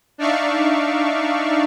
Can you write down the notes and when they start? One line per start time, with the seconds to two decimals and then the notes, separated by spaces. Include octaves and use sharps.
0.18 D4 D#4 D5 E5 F5 C#6